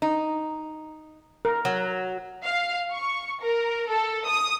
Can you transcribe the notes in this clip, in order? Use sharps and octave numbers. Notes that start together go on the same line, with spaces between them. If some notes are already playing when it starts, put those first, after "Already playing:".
D#4
A#4
F#3
F5
C#6
A#4
A4
D#6